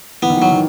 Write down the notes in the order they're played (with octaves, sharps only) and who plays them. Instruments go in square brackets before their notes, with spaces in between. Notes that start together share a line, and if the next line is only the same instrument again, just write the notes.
[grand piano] E3 [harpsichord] B3
[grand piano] D#3
[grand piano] E3 [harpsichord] F#3
[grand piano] D#3